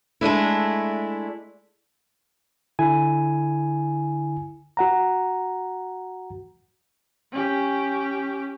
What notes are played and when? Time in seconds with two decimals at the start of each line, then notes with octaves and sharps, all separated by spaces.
0.21 G#3 A3 D4 E4
2.79 D3 E4 G#5
4.77 F#4 F#5 A#5
7.32 C#4 G4